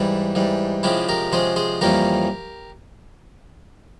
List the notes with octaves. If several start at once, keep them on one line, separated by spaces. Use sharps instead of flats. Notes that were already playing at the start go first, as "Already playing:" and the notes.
Already playing: G#2 E3 G3 E4
G#2 E3 G3
C3 F3 G#3 C#4 E4 G4
G4 A#4
C3 F3 G#3 C#4 G#4 C5
G#4 C5
F2 E3 G3 A#3 C#4 G4 A#4